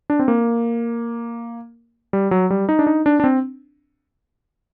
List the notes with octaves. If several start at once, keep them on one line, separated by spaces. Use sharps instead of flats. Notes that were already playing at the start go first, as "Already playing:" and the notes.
D4
C4
A#3
G3
F#3
G3
D#4
D4
D#4
D4
D4
C4